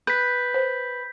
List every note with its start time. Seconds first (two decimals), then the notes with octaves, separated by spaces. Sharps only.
0.07 B4 G6 B6
0.54 C5